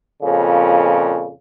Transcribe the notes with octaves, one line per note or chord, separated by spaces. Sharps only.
F2 A#2 C#3